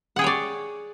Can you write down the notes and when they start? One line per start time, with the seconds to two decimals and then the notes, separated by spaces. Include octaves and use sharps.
0.16 F#5
0.19 G#4
0.21 G5
0.24 C#5
0.26 D5